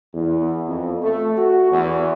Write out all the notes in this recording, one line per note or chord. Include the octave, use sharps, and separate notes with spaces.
E2
F2
A3
F#4
E2